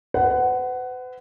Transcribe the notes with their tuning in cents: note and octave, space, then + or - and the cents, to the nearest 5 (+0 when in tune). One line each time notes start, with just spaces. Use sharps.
B4 +45 F#5 +15